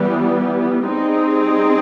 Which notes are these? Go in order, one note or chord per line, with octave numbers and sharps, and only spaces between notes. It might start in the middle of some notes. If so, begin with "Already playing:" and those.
Already playing: E3 G3 B3
G3 C4 D#4 G#4